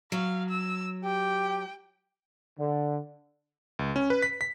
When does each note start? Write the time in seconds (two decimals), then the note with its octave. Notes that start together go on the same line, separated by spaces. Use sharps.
0.12 F#3 F5
0.50 E6
1.04 G4 G5
2.59 D3
3.79 C#2
3.96 C#4
4.10 B4
4.23 B6
4.41 B6